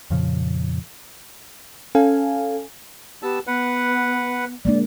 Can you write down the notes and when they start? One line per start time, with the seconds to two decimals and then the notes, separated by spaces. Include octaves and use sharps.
0.10 F2 A#2 C#3 F3
1.95 C#4 A4 F5 G#5
3.23 B3 G4 A5 E6
3.47 B3 B4 F#5
4.65 G#3 A#3 D4 D5